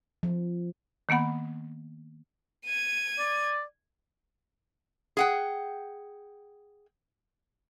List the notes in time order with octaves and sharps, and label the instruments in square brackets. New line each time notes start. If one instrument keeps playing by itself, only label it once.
[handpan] F3
[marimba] D#3 A#3 B3 F#5 B5
[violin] G#6 D#7
[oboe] D5
[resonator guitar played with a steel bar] G#4 F#5 G5